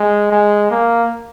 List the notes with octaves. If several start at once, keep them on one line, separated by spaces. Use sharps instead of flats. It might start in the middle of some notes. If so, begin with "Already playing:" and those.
Already playing: G#3
G#3
A#3